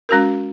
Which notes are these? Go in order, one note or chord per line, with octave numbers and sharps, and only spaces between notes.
G#3 C#4 F#4 A#4